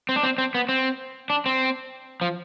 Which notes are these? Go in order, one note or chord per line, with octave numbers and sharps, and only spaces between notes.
C4
D4
C4
C4
B3
C4
D4
C4
F3